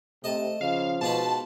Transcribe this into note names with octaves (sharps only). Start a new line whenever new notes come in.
C3 A3 D#5 A5
C#3 F3 F5
G#2 B2 F4 B4 A5